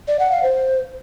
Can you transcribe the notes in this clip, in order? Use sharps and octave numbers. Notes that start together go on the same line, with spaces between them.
D5
F#5
F5
C5